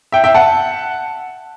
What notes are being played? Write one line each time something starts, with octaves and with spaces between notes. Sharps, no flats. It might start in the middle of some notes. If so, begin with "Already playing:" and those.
E5 G5
E5 G5
F#5 A5